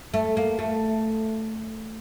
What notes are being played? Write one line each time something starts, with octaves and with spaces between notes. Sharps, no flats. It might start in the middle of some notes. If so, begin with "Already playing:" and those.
A3
A#3
A3